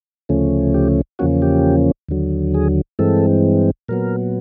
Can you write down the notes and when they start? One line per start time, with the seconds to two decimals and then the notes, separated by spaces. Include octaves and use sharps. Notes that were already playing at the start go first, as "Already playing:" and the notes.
0.29 D2 C#3 F3 A3 C#4
0.74 G4
1.19 E2 C#3 F3 A#3 C#4 F#4
1.42 G4
2.09 D#2 D3 F#3
2.54 G#4
2.99 G2 E3 G#3 C4 A4
3.89 A#2 F#3 B3 A#4